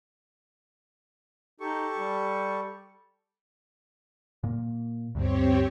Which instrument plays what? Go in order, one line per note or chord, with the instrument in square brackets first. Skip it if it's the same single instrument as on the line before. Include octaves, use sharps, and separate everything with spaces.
[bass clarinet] D#4 [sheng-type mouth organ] G4 A4 C#6
[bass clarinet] G3
[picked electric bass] A#2 A#3
[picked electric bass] D2 G2 [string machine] C4 G4 C#5